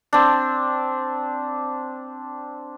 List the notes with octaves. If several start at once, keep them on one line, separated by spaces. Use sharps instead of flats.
C4 D4